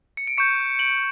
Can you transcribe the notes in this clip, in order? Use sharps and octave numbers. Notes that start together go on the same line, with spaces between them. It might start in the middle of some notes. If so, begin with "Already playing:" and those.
C#7
D7
C#6 G6 C#7 E7
D7 F#7